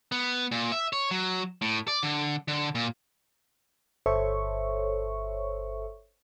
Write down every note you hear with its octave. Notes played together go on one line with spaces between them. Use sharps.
B3
A#2
E5
C#5
F#3
A2
D5
D3
D3
A#2
G1 A4 C5 C#5 E5 C#6